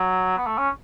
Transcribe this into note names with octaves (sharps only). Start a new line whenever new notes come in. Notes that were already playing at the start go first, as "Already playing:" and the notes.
Already playing: F#3
B3
A3
C#4